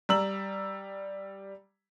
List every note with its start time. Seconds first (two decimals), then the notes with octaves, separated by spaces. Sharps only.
0.09 G3 A#5 E6 F#7